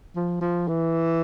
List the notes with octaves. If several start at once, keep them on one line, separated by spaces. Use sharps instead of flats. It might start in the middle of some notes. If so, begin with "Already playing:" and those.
F3
F3
E3